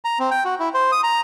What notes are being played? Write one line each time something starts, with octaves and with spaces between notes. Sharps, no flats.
A#5
C4
G5
F#4
E4
C5
D#6
A#5